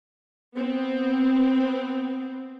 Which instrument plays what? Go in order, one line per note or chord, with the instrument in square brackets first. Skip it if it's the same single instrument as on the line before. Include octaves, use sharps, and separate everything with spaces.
[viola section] B3 C4